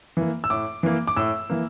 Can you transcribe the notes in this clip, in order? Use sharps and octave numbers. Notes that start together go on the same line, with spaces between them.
E3 A#3
E6
A2 D6
E3 A#3
D6
A2 E6
E3 A#3